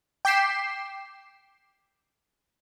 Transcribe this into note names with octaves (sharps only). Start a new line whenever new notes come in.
G5 D6 G6 B6 C7 E7